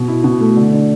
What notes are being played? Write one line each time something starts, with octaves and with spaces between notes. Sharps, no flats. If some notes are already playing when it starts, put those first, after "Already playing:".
Already playing: B2
E4
B2
A3
D3
D4